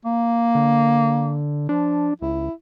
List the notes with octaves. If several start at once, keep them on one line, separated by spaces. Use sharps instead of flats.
A#3
D3
F3 D4
C#2 E4